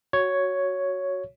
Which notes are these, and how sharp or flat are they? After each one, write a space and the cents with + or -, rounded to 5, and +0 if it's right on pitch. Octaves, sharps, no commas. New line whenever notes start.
F#4 +0 C#5 +5